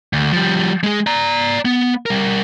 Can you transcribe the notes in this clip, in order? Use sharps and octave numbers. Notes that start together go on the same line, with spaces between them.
D2
F3 G3
G#3 G#4
D5 A#5
B3
G3 A#4